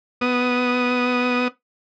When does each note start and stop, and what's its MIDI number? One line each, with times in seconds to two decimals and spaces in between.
0.21 1.48 59
0.21 1.48 87